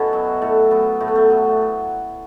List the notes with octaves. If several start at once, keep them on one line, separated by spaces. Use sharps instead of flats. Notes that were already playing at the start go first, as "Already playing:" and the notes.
Already playing: B2 B3 C#4 E4 F#4 A4
F#3
A2 A4
F#3 B3
A2 A3
B3
A3
F#3